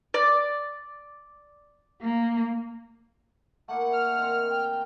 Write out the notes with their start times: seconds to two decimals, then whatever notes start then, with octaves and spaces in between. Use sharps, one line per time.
0.14 D5
2.00 A#3
3.68 A3 A#3 E4 F#5
3.93 F6
4.17 D#3 C4
4.49 G5